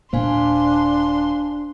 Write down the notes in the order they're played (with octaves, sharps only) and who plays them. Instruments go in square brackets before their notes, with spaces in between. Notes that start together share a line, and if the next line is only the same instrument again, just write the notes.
[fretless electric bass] D#1 A#2 A#3 [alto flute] D4 [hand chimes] C5 F5 G#5 [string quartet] C6